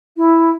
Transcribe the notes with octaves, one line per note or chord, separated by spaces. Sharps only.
E4